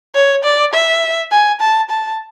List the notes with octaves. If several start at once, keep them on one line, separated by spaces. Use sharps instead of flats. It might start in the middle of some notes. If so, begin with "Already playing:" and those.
C#5
D5
E5
G#5
A5
A5